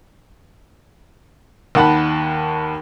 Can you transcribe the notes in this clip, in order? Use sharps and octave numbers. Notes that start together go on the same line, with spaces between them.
D#2 D#3 F#5 A5 B5